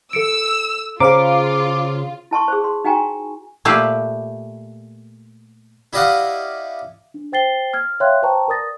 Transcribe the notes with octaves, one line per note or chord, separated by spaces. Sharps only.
A4 E6 C#7 D7
C#3 F4 G#4 C5 F5 A#5 D6
E4 A5 C6 C#6
G#4 C5
C6
D#4 F#4 G5 G#5 A#5 C#6
A#2 A3 G4 B4 E5 F5
E4 G4 D5 D#5 F5 F#5
D4
C5 G5 A6 C7 G7
F6 G#6
C#5 E5 F5 G5 C6 F#6
B4 C5 G5 A5 A#5 C#6
A#4 D5 D#6 A6 A#6